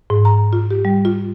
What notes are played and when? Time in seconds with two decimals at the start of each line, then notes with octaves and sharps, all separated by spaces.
0.10 G#2
0.25 A#5
0.53 F4
0.71 G4
0.85 G3
1.05 F4